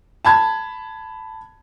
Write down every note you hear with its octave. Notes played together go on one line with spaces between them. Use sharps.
A5 B5 G#6